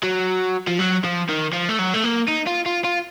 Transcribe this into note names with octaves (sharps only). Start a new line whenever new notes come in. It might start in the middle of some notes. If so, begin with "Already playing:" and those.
F#3
F3
F#3
F3
D#3
F3
A3
F#3
A3
A#3
D#4
F4
F4
F4